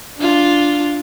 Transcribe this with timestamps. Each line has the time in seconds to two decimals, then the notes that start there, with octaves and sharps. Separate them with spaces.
0.18 D4 F4